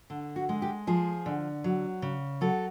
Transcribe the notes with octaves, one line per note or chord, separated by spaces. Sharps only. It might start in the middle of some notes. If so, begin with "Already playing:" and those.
D3
F#4
G#3
G4
F3 G#4
D3
F#3
C#3
F#3 A4